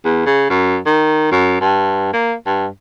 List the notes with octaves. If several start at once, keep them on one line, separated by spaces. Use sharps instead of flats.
E2
C#3
F#2
D#3
F#2
G2
A#3
G2